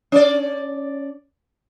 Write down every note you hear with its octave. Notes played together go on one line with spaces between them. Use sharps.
C#4 D5